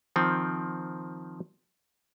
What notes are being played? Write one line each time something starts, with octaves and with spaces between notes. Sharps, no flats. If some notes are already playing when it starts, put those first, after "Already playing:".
D#3 F3 C4